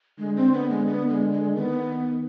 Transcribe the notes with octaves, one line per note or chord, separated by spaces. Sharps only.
D3 G#3
C4
B3
G#3
B3
G#3
G#3
D#3 B3